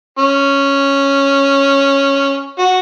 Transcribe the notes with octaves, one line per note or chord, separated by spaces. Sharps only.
C#4
F#4